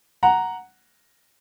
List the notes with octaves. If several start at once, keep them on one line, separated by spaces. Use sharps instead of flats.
F#5 A#5